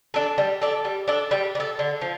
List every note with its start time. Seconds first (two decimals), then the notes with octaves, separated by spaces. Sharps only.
0.14 D4 A4
0.38 G3
0.61 D4 A4
0.85 G3
1.08 D4 A4
1.31 G3
1.55 D4
1.60 A4
1.79 D3
2.01 F3